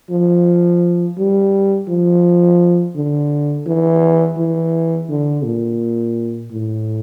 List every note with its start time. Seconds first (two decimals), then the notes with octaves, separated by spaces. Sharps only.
0.10 F3
1.18 G3
1.88 F3
2.96 D3
3.66 E3
4.39 E3
5.09 D3
5.44 A#2
6.52 A2